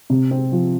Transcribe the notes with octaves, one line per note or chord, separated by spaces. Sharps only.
C3
C4
F3